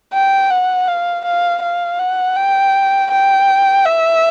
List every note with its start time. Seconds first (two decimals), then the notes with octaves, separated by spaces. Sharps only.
0.13 G5
0.50 F#5
0.88 F5
1.25 F5
1.62 F5
1.99 F#5
2.36 G5
3.11 G5
3.85 E5